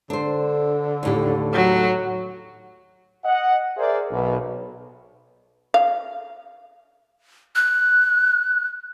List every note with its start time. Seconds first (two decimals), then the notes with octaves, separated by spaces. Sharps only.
0.10 D3 D4 C5
1.03 D#2 A2 G4
1.53 F#3
3.24 D#5 F#5
3.77 G#4 A#4 C5 D5 E5
4.10 B1 B2
5.74 F5
7.56 F#6